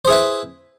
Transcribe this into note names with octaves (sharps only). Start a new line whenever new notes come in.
E4 G#4 B4 C5